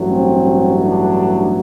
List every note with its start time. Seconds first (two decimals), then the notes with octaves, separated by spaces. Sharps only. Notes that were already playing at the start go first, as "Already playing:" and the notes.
Already playing: A1 G2 F#3 A3
0.10 C4
0.82 D4